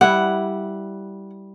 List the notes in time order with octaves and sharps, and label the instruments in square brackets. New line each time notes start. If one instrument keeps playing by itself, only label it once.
[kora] G3 E4 [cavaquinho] F#5